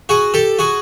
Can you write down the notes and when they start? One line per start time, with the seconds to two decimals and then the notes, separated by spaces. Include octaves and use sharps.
0.09 F#4 G#4
0.34 G4 A4
0.59 F#4 G#4